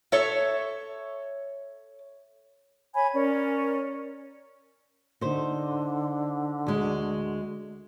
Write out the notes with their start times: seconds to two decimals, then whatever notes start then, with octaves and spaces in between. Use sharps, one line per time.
0.12 A4 C#5 E5
2.94 C#5 G#5 B5 G#6
3.13 C#4 A#4 D5
5.21 D3 D#4 C5
6.67 D2 G#3